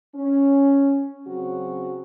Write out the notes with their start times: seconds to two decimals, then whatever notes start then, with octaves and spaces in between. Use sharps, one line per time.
0.15 C#4
1.27 C#3 F#3 C4 F#4